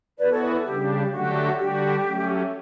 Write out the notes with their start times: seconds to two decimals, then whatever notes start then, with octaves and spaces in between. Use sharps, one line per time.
0.19 E3 B3 F#4 B4 D5
0.31 A4 C#5
0.42 B4
0.54 A4
0.66 C#3 G3 D4 G4
1.12 D3 F#3 A3 D4 F#4 G4
1.58 D3 G3 D4 F#4 G4
2.05 F#3 A3 C#4